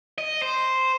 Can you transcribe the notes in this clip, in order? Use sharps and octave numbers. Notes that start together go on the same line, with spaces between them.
D#5
C5